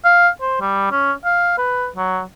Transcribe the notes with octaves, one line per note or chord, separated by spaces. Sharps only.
F5
C5
G3
C#4
F5
B4
F#3